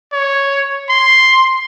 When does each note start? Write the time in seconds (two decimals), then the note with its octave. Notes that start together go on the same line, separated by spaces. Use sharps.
0.13 C#5
0.90 C6